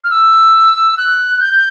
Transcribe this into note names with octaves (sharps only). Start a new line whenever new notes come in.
F6
E6
F#6
G6